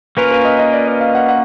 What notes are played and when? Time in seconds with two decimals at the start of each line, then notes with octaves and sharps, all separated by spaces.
0.17 A#3 C#4 F4 A#4 B4
0.31 B4
0.45 D#5
0.59 D#5
0.73 D5
0.87 D5
1.01 F5
1.15 F#5
1.29 F#5